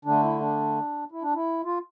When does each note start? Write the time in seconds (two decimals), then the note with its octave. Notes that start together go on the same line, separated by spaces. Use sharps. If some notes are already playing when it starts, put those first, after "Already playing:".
0.05 D3 A3 D4
0.23 E4
0.40 D4
1.12 E4
1.22 D4
1.34 E4
1.65 F4